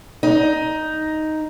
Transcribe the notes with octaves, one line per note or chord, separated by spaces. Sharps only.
D#4